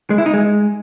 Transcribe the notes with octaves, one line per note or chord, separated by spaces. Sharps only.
G#3
E4
D#4
G#3